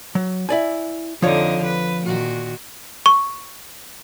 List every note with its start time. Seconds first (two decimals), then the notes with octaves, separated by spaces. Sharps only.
0.15 F#3
0.49 E4 D5 G#5
1.22 F2 D3 F3 D#4 C#5 D5
1.65 B4
2.03 A#2 D#3 F#4
3.06 C#6